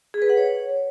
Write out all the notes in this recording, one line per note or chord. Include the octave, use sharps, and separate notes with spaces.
G#4
B4
F#5
C#5